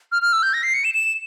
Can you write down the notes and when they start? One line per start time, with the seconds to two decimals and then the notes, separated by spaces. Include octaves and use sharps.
0.12 F6
0.22 F6
0.33 E6
0.43 G6
0.53 A#6
0.63 C7
0.74 C#7
0.84 E7
0.94 E7